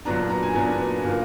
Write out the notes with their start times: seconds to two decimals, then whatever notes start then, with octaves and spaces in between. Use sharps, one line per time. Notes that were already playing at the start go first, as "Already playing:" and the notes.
0.05 A#2 F#3 B3 D4 A#5
0.29 A#5
0.42 G#5
0.54 A#2 F#3 B3 D4
1.04 A#2 F#3 A#3